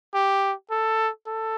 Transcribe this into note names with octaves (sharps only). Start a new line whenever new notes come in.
G4
A4
A4